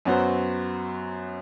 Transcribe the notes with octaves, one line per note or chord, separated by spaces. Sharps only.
F#2 F#3 B3 F#4 C5